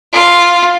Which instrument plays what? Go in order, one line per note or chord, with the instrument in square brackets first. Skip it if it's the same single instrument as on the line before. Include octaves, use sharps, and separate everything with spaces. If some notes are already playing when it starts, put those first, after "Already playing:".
[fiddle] F4